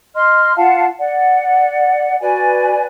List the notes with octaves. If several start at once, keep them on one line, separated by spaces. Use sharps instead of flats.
D#5 C6 F6
F4 F5 F#5 A5
D5 F#5
F#4 B4 D5 G#5